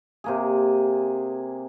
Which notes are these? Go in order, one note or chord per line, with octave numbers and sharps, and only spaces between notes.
C3 A#3 G#4